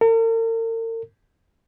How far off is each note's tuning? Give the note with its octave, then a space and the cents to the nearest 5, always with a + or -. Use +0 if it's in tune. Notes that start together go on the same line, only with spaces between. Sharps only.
A#4 -45